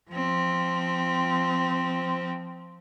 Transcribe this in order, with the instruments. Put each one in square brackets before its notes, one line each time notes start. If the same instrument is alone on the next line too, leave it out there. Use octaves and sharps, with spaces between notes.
[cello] F3 C4